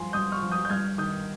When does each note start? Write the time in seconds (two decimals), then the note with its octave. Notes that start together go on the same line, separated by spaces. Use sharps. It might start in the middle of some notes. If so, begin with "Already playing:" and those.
Already playing: G2 F3 G#5 C6
0.13 G2 D#6 G6
0.32 C#6 F6
0.42 F3
0.51 D#6 G6
0.65 G6
0.70 G2 F6 G#6
0.98 D#3 D#6 G6